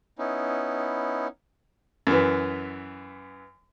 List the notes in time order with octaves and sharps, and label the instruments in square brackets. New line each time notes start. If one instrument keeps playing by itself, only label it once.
[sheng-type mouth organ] B3 C#4 D#4 E4
[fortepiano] F#2 E3